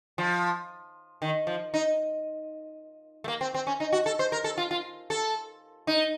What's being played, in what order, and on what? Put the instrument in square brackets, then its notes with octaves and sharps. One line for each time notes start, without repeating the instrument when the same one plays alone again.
[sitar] F3
D#3
F3
D#4
A3
A#3
C4
C4
C#4
D#4
F#4
A4
C5
A#4
A4
F4
F4
A4
D#4